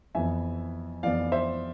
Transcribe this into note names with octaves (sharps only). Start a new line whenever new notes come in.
F2 E3 B3 E5 G#5
F2 E3 B3 D5 F5
C5 E5